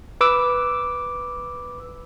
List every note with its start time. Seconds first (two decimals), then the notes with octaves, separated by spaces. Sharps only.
0.21 B4 D6 E6